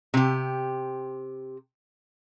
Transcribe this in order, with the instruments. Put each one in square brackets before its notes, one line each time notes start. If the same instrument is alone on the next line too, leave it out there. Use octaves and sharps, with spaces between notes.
[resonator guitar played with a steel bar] C3 G4